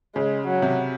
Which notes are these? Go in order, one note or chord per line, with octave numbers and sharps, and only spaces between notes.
C#3 G#3
F#3
C3